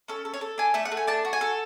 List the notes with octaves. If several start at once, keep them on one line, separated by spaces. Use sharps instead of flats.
C#4 A4
A4
C#5
A4
D4 G#5
A3 E5
F#5
A3
G#5
D4 A5
F#4
G#5
A4